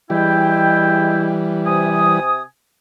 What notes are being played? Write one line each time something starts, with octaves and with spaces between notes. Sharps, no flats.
E3 G3 G#3 E4 G5
C3 G#5 D#6